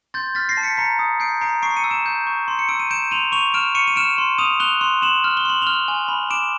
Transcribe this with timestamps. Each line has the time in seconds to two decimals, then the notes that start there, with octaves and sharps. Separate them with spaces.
0.14 C6 G6 A6
0.35 F6 A6 B6
0.49 A#6 C7
0.57 A5
0.63 B6 C#7
0.77 A#5 B6 C#7
0.99 D#6
1.20 G6 C7 D7
1.41 A#5 C7 D7
1.62 C#6 C7 D7
1.77 C#7 D#7
1.84 E6
1.91 D7 E7
2.06 G6
2.27 C#6
2.48 C6
2.59 C#7
2.69 E6 D7
2.80 D#7
2.90 G6 D7 E7
3.11 C6 D#7 F7
3.32 C#6 D#7 F7
3.54 F6 D7 E7
3.75 C#6 C#7 D#7
3.88 D#7
3.96 F6 D7 E7
4.18 C6
4.38 D#6 D#7 F7
4.60 F#6 F7 G7
4.81 C6
5.02 C6 E7 F#7
5.24 F6
5.37 G7
5.45 C6 F#7
5.62 F6 F7 G7
5.88 G#5
6.08 B5
6.30 D6 D7 E7